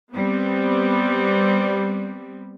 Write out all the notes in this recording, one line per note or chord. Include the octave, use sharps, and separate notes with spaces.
G3 B3 C4